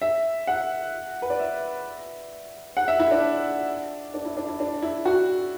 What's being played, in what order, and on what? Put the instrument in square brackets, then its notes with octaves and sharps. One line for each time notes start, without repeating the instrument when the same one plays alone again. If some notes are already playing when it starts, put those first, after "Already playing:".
[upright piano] E5
F#5
B4
D5
E5
F#5
E5
E4
D4
D4
E4
D4
E4
D4
E4
F#4